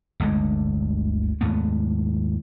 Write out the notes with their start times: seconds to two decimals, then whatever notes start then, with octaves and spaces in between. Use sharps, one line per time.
0.20 G1 D2 D3 G#3
1.41 D#2 G#2 A3 B3